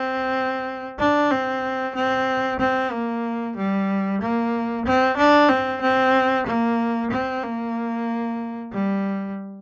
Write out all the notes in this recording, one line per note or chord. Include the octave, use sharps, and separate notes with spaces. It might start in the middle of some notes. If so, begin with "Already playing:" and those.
Already playing: C4
D4
C4
C4
C4
A#3
G3
A#3
C4
D4
C4
C4
A#3
C4
A#3
G3